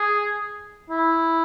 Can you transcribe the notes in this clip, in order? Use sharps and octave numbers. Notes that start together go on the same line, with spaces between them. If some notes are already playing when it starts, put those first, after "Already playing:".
Already playing: G#4
E4